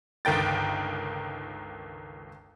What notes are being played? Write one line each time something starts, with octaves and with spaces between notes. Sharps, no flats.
G1 C#2 D#3 G5 A6